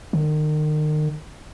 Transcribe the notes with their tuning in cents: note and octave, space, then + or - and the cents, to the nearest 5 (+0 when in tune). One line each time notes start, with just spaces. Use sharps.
D#3 -35